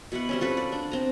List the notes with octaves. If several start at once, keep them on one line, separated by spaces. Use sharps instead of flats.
B2 E4 F#4 F#5
G3 C4 C#4
F4 F#4 A4 B4
D5
D4
C4 A#5